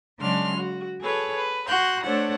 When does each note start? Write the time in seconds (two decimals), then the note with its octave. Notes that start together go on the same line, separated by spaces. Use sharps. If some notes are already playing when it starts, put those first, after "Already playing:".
0.19 C#3 F#3 G#3 D4 C6 F6
0.54 F#4
1.01 G#4 A4 B4 C#5
1.35 B4
1.67 F#4 C6 F#6 G6
2.04 A3 D4 A4 C5 C#5 F#5